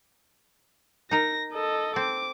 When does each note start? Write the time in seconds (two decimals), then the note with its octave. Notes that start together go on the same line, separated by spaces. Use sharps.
1.11 D#4 A#4 A#6
1.53 A4 D#5
1.96 C4 D6